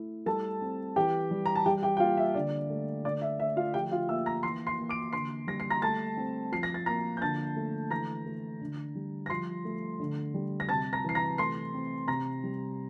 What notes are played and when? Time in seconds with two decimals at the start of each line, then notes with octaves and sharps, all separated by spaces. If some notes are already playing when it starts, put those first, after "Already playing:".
Already playing: A3 E4
0.26 G3 A4 A5
0.62 C4
0.96 E3 G4 G5
1.31 G3
1.46 A#5
1.56 A5
1.66 G3 G4 G5
1.83 G4 G5
1.97 G5
2.00 A#3 F4 F5
2.17 E5
2.34 D3 D5
2.70 A3
3.04 D3 D5
3.21 E5
3.39 A3 E5
3.56 F4 F5
3.74 F3 G4 G5
3.91 F4 F5
4.09 A#3 E5 E6
4.26 A#5 A#6
4.43 E3 C6 C7
4.67 C6 C7
4.78 A#3
4.89 D6 D7
5.13 D3 C6 C7
5.47 G3 A#6
5.60 C7
5.70 A#5 A#6
5.82 A3 A5 A6
6.17 C4
6.52 F3 C7
6.63 A#6
6.74 A6
6.86 A#3 A#5 A#6
7.17 G6
7.21 D3 A5 A6
7.57 A3
7.91 E3 A#5 A#6
8.26 A3
8.61 D3
8.95 G3
9.26 A#6
9.30 F3 C6 C7
9.65 A3
10.00 D3
10.34 G3
10.60 A#6
10.69 C3 A5 A6
10.93 A#5 A#6
11.04 E3 C7
11.15 A#5 A#6
11.38 A3 C6 C7
11.74 C4
12.08 C3 A#5 A#6
12.44 G3